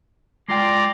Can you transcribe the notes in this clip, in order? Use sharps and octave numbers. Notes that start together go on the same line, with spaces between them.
G#3 F4 D5 G5 A#5 C6